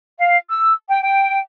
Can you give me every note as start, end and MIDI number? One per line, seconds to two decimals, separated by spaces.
0.19 0.37 77
0.48 0.73 88
0.89 1.00 79
1.02 1.39 79